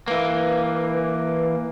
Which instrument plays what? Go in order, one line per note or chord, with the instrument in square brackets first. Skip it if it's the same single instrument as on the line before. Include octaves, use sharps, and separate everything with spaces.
[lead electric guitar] E3 A#3 [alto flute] B4